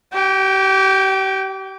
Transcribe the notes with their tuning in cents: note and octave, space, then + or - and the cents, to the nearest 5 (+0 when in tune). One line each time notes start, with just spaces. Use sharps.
G4 -35 G5 +10